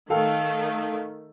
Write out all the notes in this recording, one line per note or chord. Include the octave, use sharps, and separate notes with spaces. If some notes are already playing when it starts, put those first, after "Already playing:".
D#3 A3 A4 F5 G5